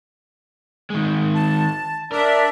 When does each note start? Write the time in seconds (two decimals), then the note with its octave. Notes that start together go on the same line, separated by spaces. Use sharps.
0.90 D#3 G#3
1.35 A5
2.12 D4 A#4 D5 E5